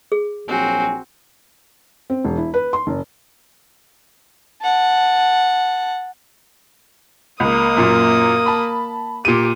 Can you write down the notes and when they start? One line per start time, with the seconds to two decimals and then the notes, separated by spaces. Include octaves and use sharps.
0.12 G#4
0.48 A#1 F#3 C4 F#4 G#5
2.10 C4
2.24 E1
2.38 E4
2.54 B4
2.73 C6
2.87 F#1
4.62 F#5 A5
7.40 C#2 A#3 D#6
7.77 F#2 A#2
8.46 A5 B5
9.25 A#2 G4 D#7